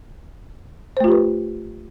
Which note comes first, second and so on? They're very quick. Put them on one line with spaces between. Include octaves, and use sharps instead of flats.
C5 A3 F4 G4 B4